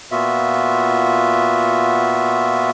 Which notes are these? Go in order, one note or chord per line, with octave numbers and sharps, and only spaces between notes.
A#2 B3 F4 F#4 E5